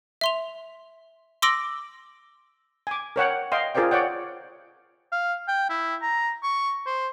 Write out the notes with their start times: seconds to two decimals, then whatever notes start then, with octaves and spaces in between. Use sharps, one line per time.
0.21 E5 C6 F7
1.42 C6 D6 E6 A#6 D7 F#7
2.87 G#5 D6
3.16 A#4 C#5 F#5 G5
3.52 D#5 F5 G5 C6
3.75 F4 G#4 A#4 C5 D5 G5
3.91 C#5 D5 F#5 G5
5.12 F5
5.48 G5
5.70 E4
6.02 A#5
6.43 C#6
6.86 C5